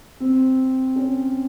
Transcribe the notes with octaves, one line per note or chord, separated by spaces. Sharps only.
C4
C#4